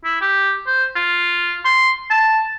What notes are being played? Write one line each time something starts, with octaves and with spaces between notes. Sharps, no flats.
E4
G4
C5
F4
C6
A5